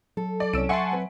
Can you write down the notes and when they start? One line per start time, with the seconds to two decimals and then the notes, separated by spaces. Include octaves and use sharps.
0.17 F#3 A4
0.40 D5
0.53 C2 C#4 E6 D7
0.69 E5 F#5 G#5 A5 C6 C#6
0.92 C4 B4